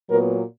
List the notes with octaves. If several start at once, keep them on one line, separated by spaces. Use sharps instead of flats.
A#2 F#3 B3 A#4